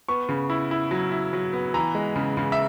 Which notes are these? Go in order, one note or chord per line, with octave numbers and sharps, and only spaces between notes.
B3 C#6
C#3
E4
E4
F#3
E4
F#3
B3
E3 A#5
G#3
C#3
C#3
E5